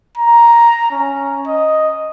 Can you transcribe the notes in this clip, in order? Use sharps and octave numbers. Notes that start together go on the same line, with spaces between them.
A#5
C#4
D#5